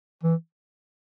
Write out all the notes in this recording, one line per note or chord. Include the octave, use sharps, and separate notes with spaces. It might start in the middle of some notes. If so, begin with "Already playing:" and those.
E3